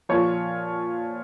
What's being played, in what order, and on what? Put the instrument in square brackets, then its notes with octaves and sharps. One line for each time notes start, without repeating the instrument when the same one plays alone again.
[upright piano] A#2 F3 C#5